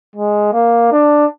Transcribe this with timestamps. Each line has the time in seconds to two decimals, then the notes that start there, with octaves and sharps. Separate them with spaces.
0.16 G#3
0.53 A#3
0.92 D4